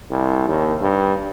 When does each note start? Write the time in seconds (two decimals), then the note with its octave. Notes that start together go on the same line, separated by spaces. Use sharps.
0.11 C2
0.48 D#2
0.81 G2